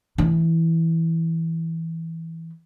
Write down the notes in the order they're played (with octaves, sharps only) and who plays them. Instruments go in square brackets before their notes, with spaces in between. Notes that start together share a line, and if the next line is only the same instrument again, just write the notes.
[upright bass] E3 E4